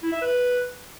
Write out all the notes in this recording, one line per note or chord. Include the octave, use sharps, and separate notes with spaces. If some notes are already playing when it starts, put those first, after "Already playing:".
E4
E5
B4